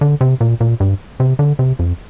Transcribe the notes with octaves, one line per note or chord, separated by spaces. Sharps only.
D3
C3
A#2
A#2
G2
C3
D3
C3
F2